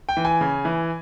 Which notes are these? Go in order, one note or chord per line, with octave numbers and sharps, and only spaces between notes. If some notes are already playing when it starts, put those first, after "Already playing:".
G5
E3
G#5
C#3
E3